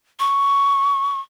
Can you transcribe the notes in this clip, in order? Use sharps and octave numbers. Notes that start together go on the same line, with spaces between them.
C#6